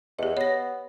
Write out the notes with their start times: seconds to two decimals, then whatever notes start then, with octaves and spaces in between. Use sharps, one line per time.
0.19 E2 G4 D#5
0.37 B3 C#5 A#6